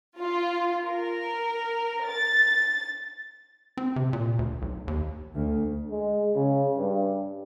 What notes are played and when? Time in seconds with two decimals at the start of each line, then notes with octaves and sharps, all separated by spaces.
0.22 F4
0.86 A#4
2.08 A6
3.77 C4
3.96 C3
4.13 A#2
4.39 D2
4.62 B1
4.88 D#2
5.35 D2
5.91 G#3
6.36 C#3
6.78 G2